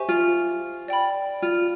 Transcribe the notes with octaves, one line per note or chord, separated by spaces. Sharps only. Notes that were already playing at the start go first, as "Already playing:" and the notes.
Already playing: G4 C5 E5 G#5 C#6
F4
D5 G5 B5
F4